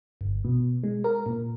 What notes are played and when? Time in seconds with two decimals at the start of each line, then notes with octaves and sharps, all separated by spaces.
0.21 G1
0.44 B2
0.83 G#3
1.04 A#4
1.26 A#2